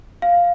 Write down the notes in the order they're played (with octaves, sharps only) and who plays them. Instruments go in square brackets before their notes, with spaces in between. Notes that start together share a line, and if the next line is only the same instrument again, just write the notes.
[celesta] F5